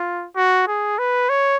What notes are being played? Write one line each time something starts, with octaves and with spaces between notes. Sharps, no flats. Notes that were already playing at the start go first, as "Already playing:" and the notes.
Already playing: F4
F#4
G#4
B4
C#5